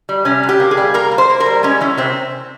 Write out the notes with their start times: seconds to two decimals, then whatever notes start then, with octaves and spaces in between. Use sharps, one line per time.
0.09 G3
0.25 C3 C#4
0.43 C3
0.49 G4
0.60 A#3
0.71 G#4
0.77 G3
0.94 A#3 A#4
1.11 A#3
1.18 C5
1.30 A#3
1.40 A#4
1.46 G3
1.63 G#3 C#4
1.81 E3 C#4
1.97 C3 C4